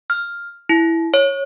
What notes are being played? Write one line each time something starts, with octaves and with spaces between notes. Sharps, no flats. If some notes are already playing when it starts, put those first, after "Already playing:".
F6
E4
C#5